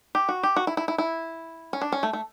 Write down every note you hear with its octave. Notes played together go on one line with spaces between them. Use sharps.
G4
F#4
G4
F#4
E4
E4
E4
E4
C#4
D4
C#4
A3
A3